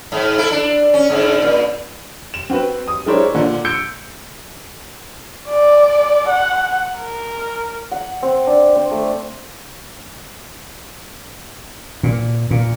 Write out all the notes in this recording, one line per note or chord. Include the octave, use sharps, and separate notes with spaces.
G#2
E4 A4
D4
C#4
G#2 D3
A#2
E7
C4 F#4 B4
D#6
G#3 D4 E4 A#4 C5 C#5
A#2 D3
E6 G6 C#7 D7
D5
F#5
A#4
F#5
C4
D4
C4
A3
A#2
A#2